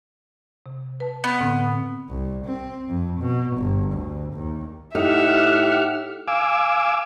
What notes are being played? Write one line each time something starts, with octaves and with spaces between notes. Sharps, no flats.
C3
B4 A5
B3
A2 D3 C4
C2
C4
F2
B2
G1
D2
D#2
A2 D#4 G4 E5 F#5 F6
F5 G#5 D6 E6